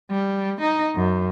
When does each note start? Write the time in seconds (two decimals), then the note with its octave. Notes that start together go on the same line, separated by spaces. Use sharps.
0.10 G3
0.61 D#4
0.95 F#2